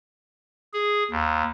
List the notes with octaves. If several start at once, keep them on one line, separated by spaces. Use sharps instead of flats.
G#4
D#2